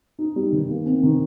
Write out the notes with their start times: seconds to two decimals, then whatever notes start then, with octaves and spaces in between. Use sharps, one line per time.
0.19 D#4
0.36 G3
0.52 D#3
0.69 A#3
0.86 C4
1.03 D#3